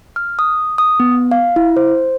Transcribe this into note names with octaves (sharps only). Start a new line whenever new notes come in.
F6
D#6
D#6
B3
F5
E4
C5